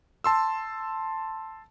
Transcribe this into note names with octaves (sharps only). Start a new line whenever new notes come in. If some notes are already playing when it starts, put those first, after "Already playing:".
A5 C6 E6